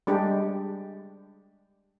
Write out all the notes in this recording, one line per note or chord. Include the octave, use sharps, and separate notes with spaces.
G3 G#3 D4 G4